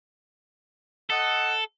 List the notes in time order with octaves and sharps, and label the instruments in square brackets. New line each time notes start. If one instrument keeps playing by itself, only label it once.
[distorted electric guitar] A4 [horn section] D#5 F#5